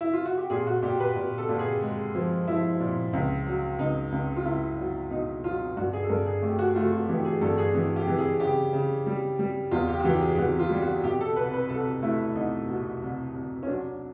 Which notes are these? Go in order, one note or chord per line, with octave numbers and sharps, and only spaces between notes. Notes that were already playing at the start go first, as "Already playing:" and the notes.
E4
F4
F#4
G4
A#2 G#4
F#4
A#2 G4
B4
A#2
A4
A#2
G#4
G#3
F3
F3 E4
A#2
C#2
F#3
C#2 D#4
C#2
F4
C#2 E4
F#3
B2 D#4
F#3 F4
G2 F#4
G#4
A4
G2 A#4
G#4
A3 G4
F#4
A3 F4
F#4
E3 G4
G#4
G2 A4
G#4
E3 G#4
G4
E3
G#4
C#3 G4
C#3
G3
G3
E2 F4
G4
F#4
E3 G4
G#4
E3 F#4
F4
G3
F#4
B2 G4
A4
C2 B4
B4
C2 A4
A3 E4
C2 D#4
B2
C2
C2
C#4
F#3 D4